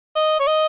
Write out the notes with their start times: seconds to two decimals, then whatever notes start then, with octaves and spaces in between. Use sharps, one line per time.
0.16 D#5
0.39 C#5
0.47 D#5